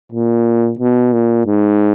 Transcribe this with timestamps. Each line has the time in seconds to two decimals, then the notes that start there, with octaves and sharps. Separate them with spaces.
0.12 A#2
0.79 B2
1.12 A#2
1.46 G#2